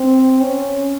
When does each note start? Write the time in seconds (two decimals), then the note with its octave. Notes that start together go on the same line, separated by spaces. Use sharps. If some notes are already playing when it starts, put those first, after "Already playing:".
Already playing: C4
0.41 C#4